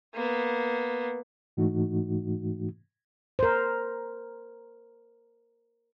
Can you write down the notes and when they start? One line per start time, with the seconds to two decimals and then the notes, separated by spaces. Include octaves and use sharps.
0.15 A#3 B3
1.57 G#2 E3 A3 D#4 F#4
3.39 A#4 C5